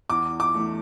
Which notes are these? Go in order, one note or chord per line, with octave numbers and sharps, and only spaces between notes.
E2 D6
D6
E3 A3